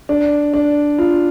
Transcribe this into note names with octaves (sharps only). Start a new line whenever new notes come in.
D4
D4
F4